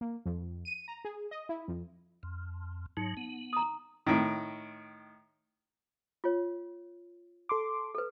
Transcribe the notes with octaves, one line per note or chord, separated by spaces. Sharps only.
A#3
F2
D#7
A#5
G#4
D#5
E4
F2
F2
G#2 F#3 D#4
B3
A#5 D#6
A2 D#3
F4 C#5
A4 C6 D6
A4 B4